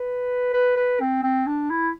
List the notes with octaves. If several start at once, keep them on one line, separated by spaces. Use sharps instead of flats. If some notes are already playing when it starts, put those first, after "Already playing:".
Already playing: B4
B4
B4
C4
C4
D4
E4